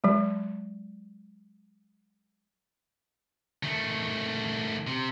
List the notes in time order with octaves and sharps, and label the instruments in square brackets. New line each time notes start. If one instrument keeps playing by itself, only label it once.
[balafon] F#3 G#3
[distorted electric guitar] D#3 A3
C3